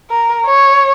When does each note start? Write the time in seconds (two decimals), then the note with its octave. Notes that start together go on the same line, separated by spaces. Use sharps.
0.10 A#4
0.46 C#5